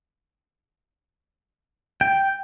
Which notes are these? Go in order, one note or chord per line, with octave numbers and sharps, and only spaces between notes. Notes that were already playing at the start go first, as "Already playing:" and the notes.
G5